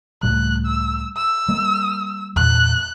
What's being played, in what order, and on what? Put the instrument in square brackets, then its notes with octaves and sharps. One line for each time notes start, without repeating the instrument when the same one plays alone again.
[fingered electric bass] C#2 A2 G3 [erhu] F#6
[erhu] E6
E6
[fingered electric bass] G3 A#3
[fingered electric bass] E2 A#2 E3 [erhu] F#6